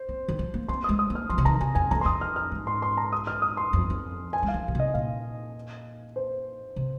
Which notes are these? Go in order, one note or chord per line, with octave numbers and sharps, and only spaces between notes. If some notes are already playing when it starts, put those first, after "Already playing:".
Already playing: C5
C4
D#3
F3
A#3
C4 C6
G#3 D#6
D#6
A#3
F6
F3 C6
C3
D#3 A#5
C3 G#5
F2 G#5
F2 A#5
C6
F2 D#6
F6
F6
G#2
C6
C6
A#5
D#6
F6
D#6
C6
F2
F2
G#5
G#3
F5
F3
A#2
C3 D#5
A#2 F5
C5
C3